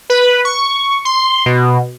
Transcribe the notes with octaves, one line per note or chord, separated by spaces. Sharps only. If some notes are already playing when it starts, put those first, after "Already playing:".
B4
C#6
C6
B2